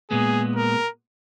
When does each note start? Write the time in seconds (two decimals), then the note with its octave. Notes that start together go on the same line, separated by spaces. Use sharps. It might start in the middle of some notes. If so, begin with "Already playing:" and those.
0.11 A#2 G#3 B3 G#4
0.56 A#4